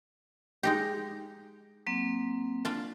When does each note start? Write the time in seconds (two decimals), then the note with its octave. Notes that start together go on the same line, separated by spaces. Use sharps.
0.63 G#3 D#4 G4
1.87 F#3 A#3 C4
2.65 D4 F4